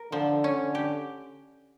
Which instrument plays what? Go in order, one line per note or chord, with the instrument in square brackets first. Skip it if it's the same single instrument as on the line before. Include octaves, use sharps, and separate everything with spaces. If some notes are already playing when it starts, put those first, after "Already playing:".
Already playing: [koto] A#4
[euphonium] D3 [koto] F3
[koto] C#4
[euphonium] D3
[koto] G4